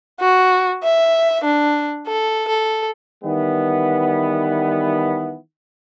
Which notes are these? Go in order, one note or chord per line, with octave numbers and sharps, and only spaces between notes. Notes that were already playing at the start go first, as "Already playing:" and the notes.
F#4
E5
D4
A4
A4
D#3 E3 G3 B3